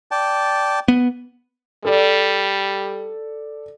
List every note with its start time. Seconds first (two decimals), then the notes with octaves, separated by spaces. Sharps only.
0.11 D5 G5 A5
0.88 B3
1.85 G3 A4 D5